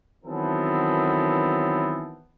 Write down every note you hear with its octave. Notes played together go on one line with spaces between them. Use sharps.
D#3 E3 F#3 B3 C4 A4